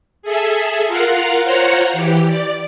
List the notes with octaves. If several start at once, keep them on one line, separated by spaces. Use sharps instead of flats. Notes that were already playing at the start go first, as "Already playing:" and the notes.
G#4 A4 E5
F4 A#4 F5 F#5
F4 C5 C#5 F#5 A#5 C#6
E3 G4
D5